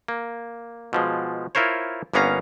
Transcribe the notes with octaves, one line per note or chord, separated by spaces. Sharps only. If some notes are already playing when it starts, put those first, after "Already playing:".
A#3
B2 F3 G#3
E4 F4 A#4 C5 C#5
G1 A#3 B3 C#4 F5 A#5